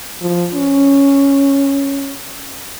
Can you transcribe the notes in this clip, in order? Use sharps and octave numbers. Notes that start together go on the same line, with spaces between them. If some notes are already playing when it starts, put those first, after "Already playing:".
F3
C#4